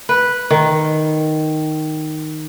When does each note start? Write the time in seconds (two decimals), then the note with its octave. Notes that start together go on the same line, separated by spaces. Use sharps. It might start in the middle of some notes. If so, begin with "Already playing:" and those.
0.09 B4
0.51 D#3